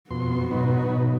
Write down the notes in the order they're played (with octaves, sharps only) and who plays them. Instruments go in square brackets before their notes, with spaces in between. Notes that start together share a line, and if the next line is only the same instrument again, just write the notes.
[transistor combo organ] F2 B2 C6 [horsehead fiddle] B3 F#4
[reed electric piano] G#2 B2 [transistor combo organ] F#3 D#4 B4
[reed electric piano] B2